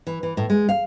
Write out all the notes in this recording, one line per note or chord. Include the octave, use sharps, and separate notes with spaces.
E3
E3
A2
G#3
F5